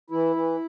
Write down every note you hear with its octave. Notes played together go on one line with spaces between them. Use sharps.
E3 E4
E3